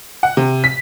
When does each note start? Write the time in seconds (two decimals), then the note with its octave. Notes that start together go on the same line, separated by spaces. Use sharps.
0.23 F#5
0.37 C3
0.64 B6